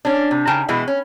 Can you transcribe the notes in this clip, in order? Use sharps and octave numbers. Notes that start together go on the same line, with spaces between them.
C#4 D4
C3
C#3 D#4 A#4 G5 A5
B2 E3 G#3 E4
C#4